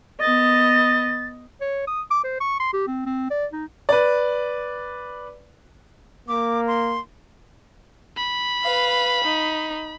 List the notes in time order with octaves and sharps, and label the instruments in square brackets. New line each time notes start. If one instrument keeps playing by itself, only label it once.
[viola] B3 D#5 [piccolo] A6
[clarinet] C#5
D#6
D6
C5
C#6
C6
G4
C4
C4
D5
D#4
[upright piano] B4 D5
[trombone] A#3 [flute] D6
[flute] C6
[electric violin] B5
[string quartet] B4 F5
D#4